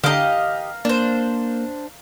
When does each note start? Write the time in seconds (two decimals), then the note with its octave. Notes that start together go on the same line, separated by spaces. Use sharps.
0.04 D3 G4 D#5 F5 A#5 D7
0.85 A#3 D4 C5 D5